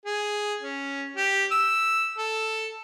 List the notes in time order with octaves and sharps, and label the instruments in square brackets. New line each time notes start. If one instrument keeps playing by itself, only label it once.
[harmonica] G#4
C#4
G4
E6
A4